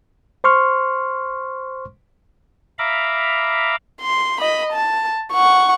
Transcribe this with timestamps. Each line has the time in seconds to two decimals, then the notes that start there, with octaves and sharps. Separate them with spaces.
0.44 C5 C6 C#6 F6
2.79 E5 F5 A#5 B5 D6
4.02 C6
4.41 D#5 B5
4.72 A5
5.33 F#5 C#6